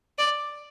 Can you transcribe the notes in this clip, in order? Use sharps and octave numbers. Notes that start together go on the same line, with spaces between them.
D5